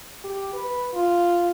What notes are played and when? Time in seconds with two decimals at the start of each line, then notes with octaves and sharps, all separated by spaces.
0.24 G4
0.53 B4
0.94 F4